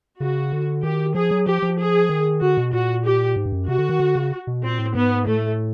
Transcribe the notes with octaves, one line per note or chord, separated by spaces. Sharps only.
C#3 F#4
D3
D#3 G4
F3 G#4
F#3
F3 G4
F3
G#4
D#3
D3 F#4
B2
A#2 F#4
G4
G#2
G2
F#2
C3 F#4
D3
D#3
D3
C#3
B2
A#2 C4
A2
G#2 B3
A2 A3